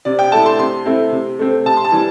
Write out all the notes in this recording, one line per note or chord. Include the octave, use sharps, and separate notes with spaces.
C3 D5
G5
A3 E4 A5
C6
C3 C6
A3 C4 E4
C3
A3 C4
C3 A5
C6
A5
E3 G3